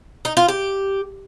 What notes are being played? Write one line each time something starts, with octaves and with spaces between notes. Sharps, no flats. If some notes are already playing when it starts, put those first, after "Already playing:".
D#4
F4
G4